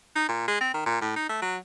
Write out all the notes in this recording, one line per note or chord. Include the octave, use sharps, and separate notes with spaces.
D#4
A#2
G#3
C4
D#3
A#2
A2
D#4
A3
F#3